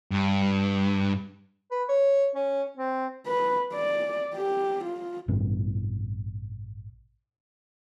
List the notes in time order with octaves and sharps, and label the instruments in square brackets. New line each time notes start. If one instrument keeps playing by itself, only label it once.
[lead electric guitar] G2
[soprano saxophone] B4
C#5
C#4
C4
[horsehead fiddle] B4
D5
G4
F4
[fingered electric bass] A1 G2 B2